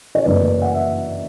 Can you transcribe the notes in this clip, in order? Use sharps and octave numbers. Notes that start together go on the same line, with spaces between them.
C#5
F#1 F#2 E3 A3 B4 D5
F#5
E5